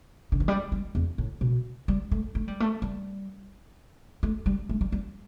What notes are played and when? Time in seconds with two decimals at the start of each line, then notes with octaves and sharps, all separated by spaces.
0.32 D3
0.40 E3
0.48 G3
0.72 G3
0.95 E2
1.18 A2
1.41 B2
1.88 G3
2.11 A3
2.35 A3
2.48 G3
2.60 A3
2.82 G3
4.23 A3
4.46 G3
4.69 A3
4.81 G3
4.92 G3